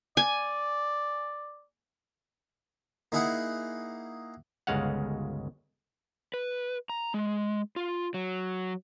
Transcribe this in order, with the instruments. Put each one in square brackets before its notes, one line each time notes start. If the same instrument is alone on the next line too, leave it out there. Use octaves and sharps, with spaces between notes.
[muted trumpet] D5 [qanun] G#5
[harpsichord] A#3 D#4 E4 G#4 F#5
[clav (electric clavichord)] G1 C#2 C#3 G#3 F5 F#5
[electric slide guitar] B4
A#5
G#3
F4
F#3